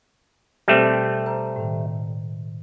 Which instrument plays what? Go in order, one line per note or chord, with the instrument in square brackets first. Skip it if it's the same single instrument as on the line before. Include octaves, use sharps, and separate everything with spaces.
[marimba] B2 F6 [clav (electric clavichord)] G3 A3 C4
[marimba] C5 A#5
A2 D#3